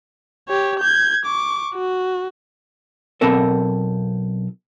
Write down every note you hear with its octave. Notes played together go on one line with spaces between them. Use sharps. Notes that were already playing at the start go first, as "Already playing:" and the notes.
G4 C#5
G6 G#6
C#6 D6
F#4
B1 B3 C4 A4 A#4